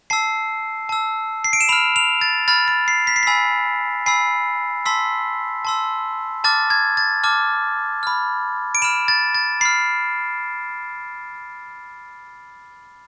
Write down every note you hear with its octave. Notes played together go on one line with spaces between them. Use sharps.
A5 E6 C7
A5 E6
C7
D7
E7
B5 F6 F7
F7
A6
B5 F6 A6
A6
C7
B6
C7
G#5 B5 E6 B6
G#5 B5 E6 C7
A5 C6 E6 B6
A5 C6 E6
A5 D6 F6 A6
G#6
A6
A5 D6 F6
B5 F6
D7
B5 F6 E7
A6
A6
B5 F6 C7